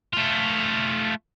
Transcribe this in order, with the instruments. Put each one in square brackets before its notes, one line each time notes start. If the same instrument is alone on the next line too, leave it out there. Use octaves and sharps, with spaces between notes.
[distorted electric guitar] A3 F4